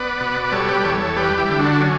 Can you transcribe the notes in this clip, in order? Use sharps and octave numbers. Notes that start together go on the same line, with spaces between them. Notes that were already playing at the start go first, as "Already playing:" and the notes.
Already playing: B3 B4 D5
B2
B4
G3 A4 C#5
G4 B4
E2 A4 C#5
A4 C#5
G3 G4 B4
E4 G4
D3
D4 F#4
F#3 C#4